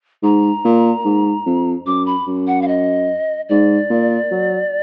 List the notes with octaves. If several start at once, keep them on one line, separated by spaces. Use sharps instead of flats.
G#2 A#5
A#2
G#2
F2
F#2 D6
B5
F#2
F#5
F5
D#5
G#2 D5
A#2
F#3